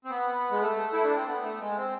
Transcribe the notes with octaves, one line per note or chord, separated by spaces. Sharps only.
C4
B3
G#3
A3
E4
D4
C4
B3
A3
G#3
C4